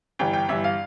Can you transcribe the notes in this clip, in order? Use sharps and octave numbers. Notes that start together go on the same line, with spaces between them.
G1 G2 E3 G5
G5
G1 G2 E3 E5
F5